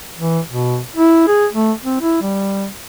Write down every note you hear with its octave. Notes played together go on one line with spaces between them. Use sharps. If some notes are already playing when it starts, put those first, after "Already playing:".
E3
B2
E4
G#4
A3
C4
E4
G3